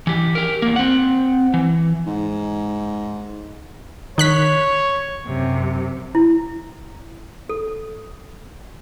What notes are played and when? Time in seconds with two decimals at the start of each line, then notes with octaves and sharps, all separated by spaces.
0.07 E3 G4
0.35 G4 A#4
0.62 E2 A#3
0.76 C4 F#5
1.54 E3
2.06 G#2
4.18 D#3 C#5 F#6 B6
5.28 F#2 C3
6.15 E4
7.49 A4